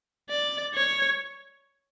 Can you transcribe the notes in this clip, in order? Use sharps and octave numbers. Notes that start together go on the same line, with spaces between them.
D5
C#5